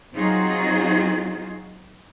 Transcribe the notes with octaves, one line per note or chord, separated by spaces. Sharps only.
F#3 C4 D#4 F4 F#4 G#4